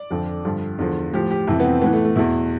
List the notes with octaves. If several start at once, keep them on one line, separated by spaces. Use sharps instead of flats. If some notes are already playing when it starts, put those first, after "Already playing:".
Already playing: D5
F2 D3 F3
G2 D3 F3 F4
E2 D3 F3
A2 F3 G4
G4
F2 C3 E3 E4
B3
C4
A2 E3 B3
A3
A3
E2 B2 E4